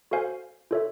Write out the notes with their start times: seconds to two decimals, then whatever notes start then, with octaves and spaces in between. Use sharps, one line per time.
0.11 F#4 A4 C5 F5 G#5
0.71 F4 A4 C#5 E5